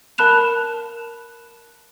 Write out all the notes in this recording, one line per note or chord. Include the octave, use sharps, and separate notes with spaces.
A#4 A5 B5 F#6 E7 F7